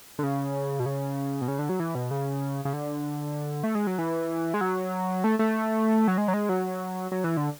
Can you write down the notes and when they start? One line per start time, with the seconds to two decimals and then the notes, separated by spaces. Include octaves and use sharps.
0.19 D3
0.23 C#3
0.80 B2
0.86 C#3
1.41 B2
1.48 C#3
1.59 D3
1.69 F#3
1.80 E3
1.95 B2
2.11 C#3
2.65 C#3
2.73 D3
3.64 A3
3.75 G#3
3.87 F#3
3.99 E3
4.54 G#3
4.61 F#3
5.24 A3
5.39 A3
6.08 F#3
6.18 G#3
6.28 F#3
6.34 G#3
6.49 F#3
7.12 F#3
7.24 E3
7.37 D3